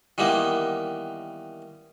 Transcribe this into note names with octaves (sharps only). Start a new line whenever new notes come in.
D#3 E3 G3 A#3 B3